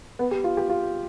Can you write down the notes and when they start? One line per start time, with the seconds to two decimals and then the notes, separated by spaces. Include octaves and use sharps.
0.19 B3
0.31 G4
0.44 F4
0.57 G4
0.70 F4